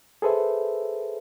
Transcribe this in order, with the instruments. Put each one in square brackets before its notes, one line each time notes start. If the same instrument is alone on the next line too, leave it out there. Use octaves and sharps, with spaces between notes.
[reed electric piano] G#4 A4 B4 C5 E5